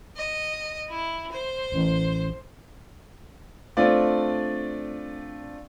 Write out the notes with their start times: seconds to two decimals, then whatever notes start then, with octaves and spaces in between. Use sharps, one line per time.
0.17 D#5
0.90 E4
1.32 C5
1.72 A1
3.77 A3 C4 D4 F4 D5